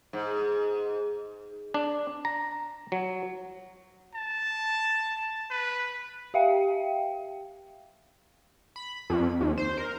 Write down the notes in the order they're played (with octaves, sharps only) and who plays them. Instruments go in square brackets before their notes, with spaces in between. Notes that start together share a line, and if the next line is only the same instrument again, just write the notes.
[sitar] G#2
[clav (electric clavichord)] D4
A#5
F#3
[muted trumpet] A5
B4
[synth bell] G4 E5 F5 G5
[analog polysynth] B5
F2
D#2
C5
A#4